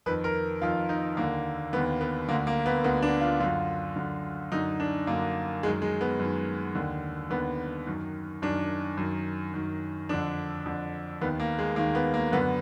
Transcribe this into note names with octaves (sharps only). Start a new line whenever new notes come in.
F2 D#3 B4
A#4
F2 D#3 F4
D#4
D#2 D3 A#3
D#2 D3 B3
B3
D2 D3 A#3
A#3
B3
D2 D3 B3
D4
F4
F#2 D3 F4
F#2 D3
F#2 D3 D#4
D4
F#2 D3 A#3
F#2 D#3 G#3
G#3
B3
F#2 D#3
D#2 D3
D#2 D3 B3
F#2 D#3
F#2 D#3 D4
F#2 D#3
F#2 D#3
F2 D3 D4
F2 D3
D#2 D#3 B3
A#3
G#3
D#2 D#3 A#3
B3
A#3
F#2 D3 B3